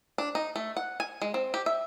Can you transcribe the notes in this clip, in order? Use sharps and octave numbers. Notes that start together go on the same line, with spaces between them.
D4
D#4
A3
F#5
G#5
G#3
C4
G4
E5